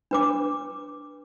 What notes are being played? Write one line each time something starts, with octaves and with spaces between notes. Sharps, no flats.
D4 B4 D6